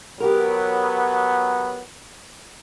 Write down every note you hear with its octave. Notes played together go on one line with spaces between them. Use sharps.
F#3 B3 G4 A#4